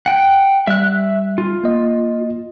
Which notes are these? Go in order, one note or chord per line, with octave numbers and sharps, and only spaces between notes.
F#5 G5
G3 E5 F#6
F4
A#3 D#5